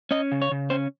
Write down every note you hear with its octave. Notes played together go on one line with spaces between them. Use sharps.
C#4 D#5
C#3
C#5
C#3
C#4 C5